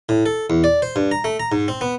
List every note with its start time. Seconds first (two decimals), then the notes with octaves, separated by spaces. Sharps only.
0.09 A2
0.26 A4
0.50 E2
0.64 D5
0.82 C5
0.96 G2
1.12 A#5
1.24 A3
1.40 A#5
1.52 G#2
1.68 C4
1.81 B3